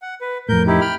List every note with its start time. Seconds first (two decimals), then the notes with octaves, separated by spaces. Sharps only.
0.02 F#5
0.21 B4
0.49 F2 A2 A#4 G6
0.67 D#4 E4 G4
0.81 G5 B5 F6